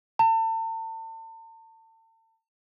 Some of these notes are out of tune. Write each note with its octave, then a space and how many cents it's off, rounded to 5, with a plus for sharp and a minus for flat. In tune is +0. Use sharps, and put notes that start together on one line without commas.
A5 +40